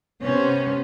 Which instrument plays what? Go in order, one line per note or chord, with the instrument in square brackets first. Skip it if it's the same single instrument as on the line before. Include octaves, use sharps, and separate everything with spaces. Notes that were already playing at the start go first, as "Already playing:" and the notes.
[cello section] C3 B3 C#4 C5